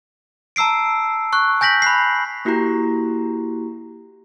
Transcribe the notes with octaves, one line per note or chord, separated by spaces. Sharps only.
A5 A#5 E6 C7 D7
C#6 F#6
G#5 G6 A#6 B6 F#7
B5 F#6 C7
A#3 E4 F#4 G4 A#5